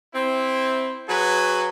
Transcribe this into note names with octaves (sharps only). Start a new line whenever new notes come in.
C4 E4
F#3 F#4 G#4 B4